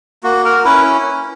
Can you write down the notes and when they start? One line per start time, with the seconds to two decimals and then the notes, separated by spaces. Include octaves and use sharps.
0.23 A#3 F#4
0.45 A#4
0.64 C#4 E4 B4